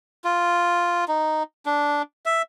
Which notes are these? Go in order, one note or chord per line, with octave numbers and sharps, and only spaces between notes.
F4
D#4
D4
E5